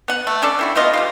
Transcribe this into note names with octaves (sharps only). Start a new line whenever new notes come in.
B3 F#5
A3
C#4 D4 A4 D5
C4 E4 F#4
A3 B3 F4 D#5
G3 G#3 F4